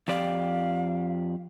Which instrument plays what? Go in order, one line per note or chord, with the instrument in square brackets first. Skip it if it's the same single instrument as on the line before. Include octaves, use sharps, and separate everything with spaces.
[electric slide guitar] F2 G4 D5 [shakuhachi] F5